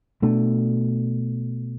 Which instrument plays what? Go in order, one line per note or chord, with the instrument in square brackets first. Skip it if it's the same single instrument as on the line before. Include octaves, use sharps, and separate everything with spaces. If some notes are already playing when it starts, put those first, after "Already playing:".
[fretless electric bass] B2 A3 D4